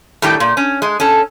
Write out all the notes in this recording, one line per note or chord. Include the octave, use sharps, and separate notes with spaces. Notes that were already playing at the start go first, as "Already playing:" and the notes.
A2 D#3 G3 G4 G5
A#2
C#4
G#3
C#4 A4